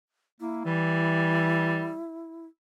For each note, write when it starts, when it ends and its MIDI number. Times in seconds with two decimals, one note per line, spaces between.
0.40 0.65 58
0.40 2.46 64
0.65 1.89 52
0.65 1.98 55